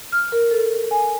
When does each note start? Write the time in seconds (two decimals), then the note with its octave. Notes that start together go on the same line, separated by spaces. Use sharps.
0.12 F6
0.32 A#4
0.51 A4
0.91 G#5